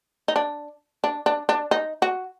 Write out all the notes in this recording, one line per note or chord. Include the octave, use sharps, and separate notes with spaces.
D#4
D4
D4
D4
D4
D#4
F#4